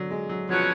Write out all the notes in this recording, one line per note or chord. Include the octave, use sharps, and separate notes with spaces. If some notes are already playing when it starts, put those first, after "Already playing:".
Already playing: D3 F#3
G#3
F#3
B2 F3 F#3 C#4 F#4 C#5